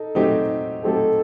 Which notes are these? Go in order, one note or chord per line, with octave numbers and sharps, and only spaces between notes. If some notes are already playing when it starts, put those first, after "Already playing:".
Already playing: D#4 A4
F#3 A3 C4 D#4 G4
F#3 A3 C4 D#4 G4 A4